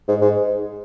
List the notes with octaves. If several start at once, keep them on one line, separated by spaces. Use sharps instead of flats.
G#2
G#2